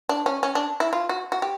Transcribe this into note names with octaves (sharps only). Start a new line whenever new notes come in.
D4
C#4
C#4
D4
E4
F4
F#4
F#4
G4